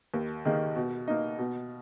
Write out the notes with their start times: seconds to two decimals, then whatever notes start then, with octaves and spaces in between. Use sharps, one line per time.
0.14 D#2
0.45 D#3 A#3 D#4 G#4
0.76 B2
1.08 A#3 D#4
1.39 B2